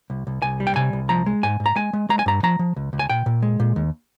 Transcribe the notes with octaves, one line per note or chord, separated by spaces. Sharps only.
C2
C2
C2 G#5
G3
G5
C3 G#5
C2
F3 A#5
G#3
G#2 G#5
G#2
A#5
G#3 G#5
G#3
G#3 A#5
G#5
G2 A#5
F3 A#5
F3
C#2
C#2
G#5
A#2 G5
A#2
G#3
A#2
D#2